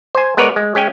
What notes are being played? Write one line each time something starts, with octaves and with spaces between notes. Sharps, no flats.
C5 G#5
G#3 B3 A#4 B4 C#5 D5
G#3
G#3 C#4 G5 G#5